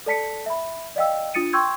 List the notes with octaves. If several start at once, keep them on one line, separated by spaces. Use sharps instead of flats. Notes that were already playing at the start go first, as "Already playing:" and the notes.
A4 D5 A5 B6 C#7
E5 B5
D5 D#5 F5 G5 E6
D4 F4 D#6 A6 C#7 D#7
G5 C6 C#6 E6 G6 G#6